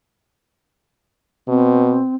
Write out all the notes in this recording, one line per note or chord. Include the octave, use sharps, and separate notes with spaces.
B2 C4